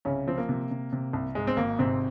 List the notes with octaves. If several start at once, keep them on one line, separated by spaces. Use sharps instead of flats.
C2 C#3 C#4
F3 C4
A#3
C3
C3
C3
C2
G#2 G#3
C4
G#1 A#3
G#2 C3 C4